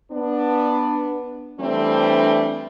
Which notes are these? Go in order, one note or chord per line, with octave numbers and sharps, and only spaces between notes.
B3 D4
E3 G3 A3 C4 D4